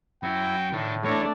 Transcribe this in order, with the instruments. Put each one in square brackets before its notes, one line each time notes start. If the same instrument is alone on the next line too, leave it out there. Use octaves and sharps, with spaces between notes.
[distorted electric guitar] F#2 F#4 [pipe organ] E4 [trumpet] G5
[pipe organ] A2 [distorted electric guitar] D#3 D4
[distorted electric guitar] E2 [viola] A3 D4 [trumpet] C#5